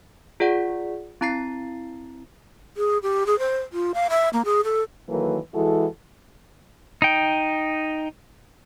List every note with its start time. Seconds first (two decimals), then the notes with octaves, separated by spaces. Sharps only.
0.40 F4 G#4 D5 F#5
1.21 C4 E4 A#5 A6 C7
2.77 G#4
3.03 G4
3.26 G#4
3.39 C5
3.73 F4
3.94 F5
4.10 E5
4.33 A#3
4.45 G#4
4.64 A4
5.08 D#3 E3 F#3 A#3 A4 B4
5.53 E3 G#3 E4 F#4 A4
7.02 D#4 G5